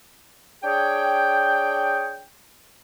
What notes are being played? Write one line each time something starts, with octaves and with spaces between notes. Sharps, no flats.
D4 G#4 C#5 G5